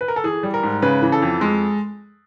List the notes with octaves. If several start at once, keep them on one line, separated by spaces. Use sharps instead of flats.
B4
A#4
A4
E3 G#4
G3
A#4
G#2
C#3 B4
E3
A4
F2
G#3